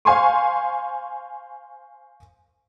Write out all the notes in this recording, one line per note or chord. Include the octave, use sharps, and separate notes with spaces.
C5 F5 G#5 C6 C#6